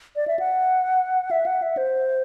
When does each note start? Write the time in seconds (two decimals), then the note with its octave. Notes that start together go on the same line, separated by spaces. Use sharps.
0.16 D5
0.28 E5
0.39 F#5
1.31 E5
1.46 F#5
1.62 E5
1.77 C5